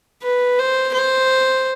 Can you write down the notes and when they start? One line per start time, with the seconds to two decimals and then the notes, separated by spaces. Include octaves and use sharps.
0.23 B4
0.59 C5
0.93 C5